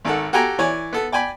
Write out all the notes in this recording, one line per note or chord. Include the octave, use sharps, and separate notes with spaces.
G#1 D#3 A4 F#5
F#4 G4 A4 G5 G#5 A#5
E3 C#5 D5 G#5
B3 A4
D5 G5 G#5 B5